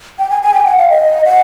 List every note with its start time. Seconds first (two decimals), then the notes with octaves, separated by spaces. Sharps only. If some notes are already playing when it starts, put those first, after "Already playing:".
0.19 G5
0.30 G#5
0.43 G#5
0.54 G5
0.66 F#5
0.78 F5
0.90 D#5
1.25 F#5